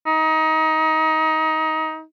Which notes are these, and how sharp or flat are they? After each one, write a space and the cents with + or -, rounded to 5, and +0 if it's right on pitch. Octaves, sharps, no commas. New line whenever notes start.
D#4 +25